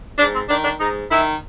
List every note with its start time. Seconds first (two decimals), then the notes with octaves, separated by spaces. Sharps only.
0.17 G#2 D4
0.32 C4
0.48 D#3 D4
0.63 D4
0.78 G#2 D#4
1.09 D#3 E4